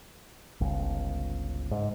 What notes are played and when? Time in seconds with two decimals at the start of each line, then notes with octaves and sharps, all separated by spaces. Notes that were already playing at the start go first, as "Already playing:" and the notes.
0.61 G1 C#2
1.71 G#2